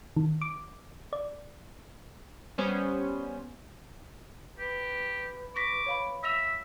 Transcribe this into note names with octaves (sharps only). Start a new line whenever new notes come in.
D#3
D6
D5
G3 B3 C#4 C5
G4 B4
C#6 D6 A#6 B6
C#5 F5 B5
E5 E6 A#6 F7